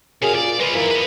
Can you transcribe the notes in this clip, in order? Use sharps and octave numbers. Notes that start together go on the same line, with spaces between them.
F#2 C3 G#4 F5
A#2 D5
G#3 F4 B4
F2 D#3 E3 A#3 E4
B4 D#5